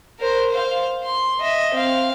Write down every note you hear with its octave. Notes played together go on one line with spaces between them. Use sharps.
A#4 C5
C5 F5
C6
D#5 E5
C4 F5